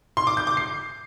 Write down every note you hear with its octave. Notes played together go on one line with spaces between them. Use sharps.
C6
D6
G6
D6
C7